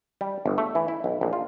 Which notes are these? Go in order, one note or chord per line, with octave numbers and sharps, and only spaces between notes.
G3
G1
A3
E3
E4
B1
A#1
F4